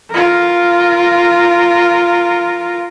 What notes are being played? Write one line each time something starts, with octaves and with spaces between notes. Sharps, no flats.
F4 A#4